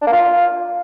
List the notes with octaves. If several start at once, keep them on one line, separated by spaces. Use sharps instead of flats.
D4
A#3
F4